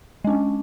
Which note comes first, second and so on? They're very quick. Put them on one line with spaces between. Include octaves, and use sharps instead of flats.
G#3 D4 C#4